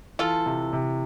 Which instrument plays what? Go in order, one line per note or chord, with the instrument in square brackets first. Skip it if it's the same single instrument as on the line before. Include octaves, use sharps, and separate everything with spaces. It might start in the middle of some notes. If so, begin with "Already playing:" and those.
[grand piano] E3 [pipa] F4 A4
[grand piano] C3
C3